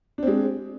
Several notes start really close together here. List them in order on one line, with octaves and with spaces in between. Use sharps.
D4 C4 G#3